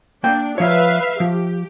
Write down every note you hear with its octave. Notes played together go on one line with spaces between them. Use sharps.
A#3 D4 G5
F3 B4 C#5 E5 F5
F3 G4